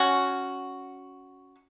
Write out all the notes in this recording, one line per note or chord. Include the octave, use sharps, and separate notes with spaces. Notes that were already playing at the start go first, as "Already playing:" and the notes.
Already playing: C#4 F#4